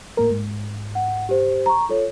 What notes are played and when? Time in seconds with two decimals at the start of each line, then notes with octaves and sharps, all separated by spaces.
0.17 A2 A#3 A#4
0.31 G#2
0.95 F#5
1.29 G4 C5
1.66 A#5 C#6
1.89 F4 A4 C#5